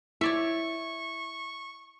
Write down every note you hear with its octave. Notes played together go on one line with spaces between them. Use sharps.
E4 C#5 D5 E5 C#6